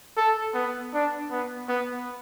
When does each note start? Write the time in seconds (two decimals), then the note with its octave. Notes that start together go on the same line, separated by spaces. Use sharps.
0.17 A4
0.54 B3
0.94 D4
1.31 B3
1.69 B3